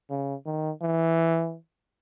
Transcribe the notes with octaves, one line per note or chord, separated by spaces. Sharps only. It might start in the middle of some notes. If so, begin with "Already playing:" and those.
C#3
D#3
E3